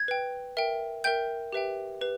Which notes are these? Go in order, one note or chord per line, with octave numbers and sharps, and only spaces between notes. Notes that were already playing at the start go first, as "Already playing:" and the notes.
Already playing: G#6
B4 G5
A#4 E5 G5
A#4 E5 G5 G6
G4 B4 E5 G5
G4 B4